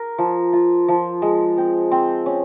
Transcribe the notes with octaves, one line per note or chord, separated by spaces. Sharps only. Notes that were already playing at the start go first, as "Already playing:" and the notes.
Already playing: A#4
F3
F4
F3
G#3
C4
C4
C#4